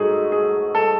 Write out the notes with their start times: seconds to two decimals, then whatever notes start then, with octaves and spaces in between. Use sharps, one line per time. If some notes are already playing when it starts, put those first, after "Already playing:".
Already playing: G#2 A3 D#4 F#4 G#4
0.32 G#4
0.75 A4